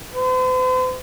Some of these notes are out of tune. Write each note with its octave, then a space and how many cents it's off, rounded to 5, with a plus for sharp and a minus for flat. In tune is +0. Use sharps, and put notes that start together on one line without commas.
C5 -45